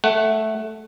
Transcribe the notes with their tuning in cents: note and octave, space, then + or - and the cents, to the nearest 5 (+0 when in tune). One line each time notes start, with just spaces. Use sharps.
A3 -5 F#5 +20